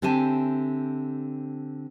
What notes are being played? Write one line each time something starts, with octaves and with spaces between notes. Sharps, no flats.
D3 C4 G4 E5 G#5 A5